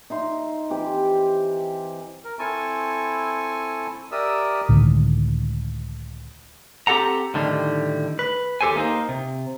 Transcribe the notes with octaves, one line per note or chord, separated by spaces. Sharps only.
D#4 E5 C6
E3 C4 G4
A#4
C4 E4 A4 G#5 A5 C#6
G4 A#4 D5 E5 D#6 E6
C#2 A2 D3 D#3
C4 G4 A4 F#5 A#5
A2 D3 D#3 G3
B4
D#2 G4 A4 C5 G#5
A#3 D#4 C5
C3